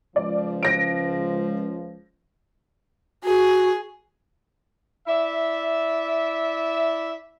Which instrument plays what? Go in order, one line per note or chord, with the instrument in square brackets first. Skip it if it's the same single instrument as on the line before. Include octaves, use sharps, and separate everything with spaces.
[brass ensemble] C#2 F3 [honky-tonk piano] D5
[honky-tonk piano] A#6 D7
[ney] F#4 [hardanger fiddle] G#4
[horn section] E4 D5 E5